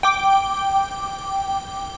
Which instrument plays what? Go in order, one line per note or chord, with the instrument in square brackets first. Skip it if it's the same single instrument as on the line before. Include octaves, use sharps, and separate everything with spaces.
[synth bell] G5 D6